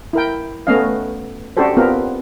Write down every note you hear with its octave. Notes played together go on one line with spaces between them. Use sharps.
E4 A#4 G5
A3 B3 C#4 D#5 F5
C#4 D4 F#4 G4 A4 C5
B3 C4 F4 G4 A#4